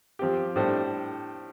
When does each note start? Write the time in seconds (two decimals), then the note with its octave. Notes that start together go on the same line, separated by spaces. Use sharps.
0.19 F3 C4 G4
0.56 A2 G3 D4 A4 C5